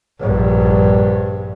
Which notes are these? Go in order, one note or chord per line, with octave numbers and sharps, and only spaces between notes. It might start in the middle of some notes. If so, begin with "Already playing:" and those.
A#1 G2